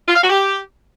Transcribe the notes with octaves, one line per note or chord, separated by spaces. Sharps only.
F4
F5
F#4
G4